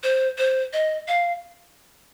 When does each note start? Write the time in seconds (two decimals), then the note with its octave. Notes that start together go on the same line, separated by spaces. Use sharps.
0.03 C5
0.38 C5
0.73 D#5
1.08 F5